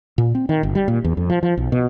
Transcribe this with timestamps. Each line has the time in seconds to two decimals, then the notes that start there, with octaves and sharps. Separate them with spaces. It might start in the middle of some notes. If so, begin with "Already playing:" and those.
0.18 A#2
0.35 C4
0.49 D#3
0.63 G1
0.75 G3
0.88 A#2
1.04 E2
1.17 F2
1.30 F3
1.43 F3
1.57 B1
1.72 B2